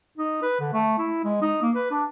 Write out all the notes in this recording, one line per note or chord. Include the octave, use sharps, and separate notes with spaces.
D#4
B4
D3
A3
E4
G#3
D#4
A#3
B4
D4